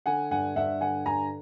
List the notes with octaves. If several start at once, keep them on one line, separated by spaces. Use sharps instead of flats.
D3 F#5 G#5
G2 F#5 G#5
G2 E5 F#5
D3 F#5 G#5
G2 G#5 A#5